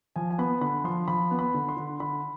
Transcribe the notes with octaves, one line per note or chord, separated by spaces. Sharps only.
F3 G#5
G#5
B3 B5
D3 B5
F3 C6
F3 B5
B3
B5
D3
C6
D3
D3 B5